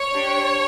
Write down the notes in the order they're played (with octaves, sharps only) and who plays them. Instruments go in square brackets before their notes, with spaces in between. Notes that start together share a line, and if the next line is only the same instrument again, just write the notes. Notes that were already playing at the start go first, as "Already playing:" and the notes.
Already playing: [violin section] C#5
D4 G4